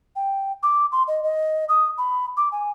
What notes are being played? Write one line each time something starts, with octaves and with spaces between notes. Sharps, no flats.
G5
D6
C6
D#5
D#5
D#6
B5
D6
G#5